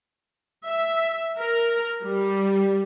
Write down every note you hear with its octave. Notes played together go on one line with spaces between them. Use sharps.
E5
A#4
G3